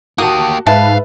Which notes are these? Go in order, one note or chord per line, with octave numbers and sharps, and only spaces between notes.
A#3 F#4 G4 A5 D#6
G#2 B4 E5 F5 A5